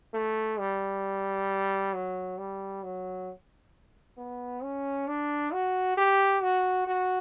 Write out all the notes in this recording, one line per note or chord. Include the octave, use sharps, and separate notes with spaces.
A3
G3
F#3
G3
F#3
B3
C#4
D4
F#4
G4
F#4
F#4